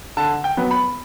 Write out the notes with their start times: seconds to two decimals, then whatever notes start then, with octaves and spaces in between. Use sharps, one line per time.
0.17 D3 A5
0.44 G5
0.57 F#3 B3
0.71 B5